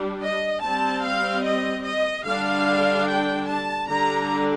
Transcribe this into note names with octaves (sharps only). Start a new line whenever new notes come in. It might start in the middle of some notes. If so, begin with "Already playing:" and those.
Already playing: G3 D4
D#5
G3 C4 A5
F5
D#5
D#5
D3 G3 D4 F5
G5
A5
D3 G3 D4 A#5